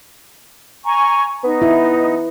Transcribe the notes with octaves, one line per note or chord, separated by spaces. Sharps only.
G#5 A#5 C#6
B3 D#4
E4